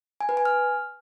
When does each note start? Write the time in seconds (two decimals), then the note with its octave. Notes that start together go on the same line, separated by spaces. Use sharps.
0.21 G#5
0.29 B4
0.37 G#5
0.45 F6